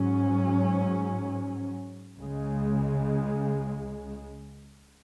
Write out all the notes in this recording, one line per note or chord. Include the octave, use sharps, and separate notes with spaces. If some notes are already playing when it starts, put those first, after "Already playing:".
Already playing: G#2 F#3 C#4
C#2 C#3 G#3